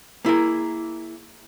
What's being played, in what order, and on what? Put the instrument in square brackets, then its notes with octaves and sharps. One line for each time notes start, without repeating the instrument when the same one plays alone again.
[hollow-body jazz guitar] A#3 E4 G#4 A#4